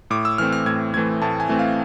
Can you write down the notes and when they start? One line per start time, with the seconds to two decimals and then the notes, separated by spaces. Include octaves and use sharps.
0.10 A2 D6
0.25 E6
0.38 E3 A3 C4 F6
0.52 F6
0.66 A2 G#6
0.94 E3 A3 C4 G#6
1.22 A2 A5
1.40 G#5
1.49 E3 A3 C4
1.59 F5